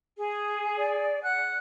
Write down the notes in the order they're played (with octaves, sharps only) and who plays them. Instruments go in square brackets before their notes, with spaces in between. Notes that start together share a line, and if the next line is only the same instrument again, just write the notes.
[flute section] G#4
[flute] D5
[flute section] F#5 [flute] F#6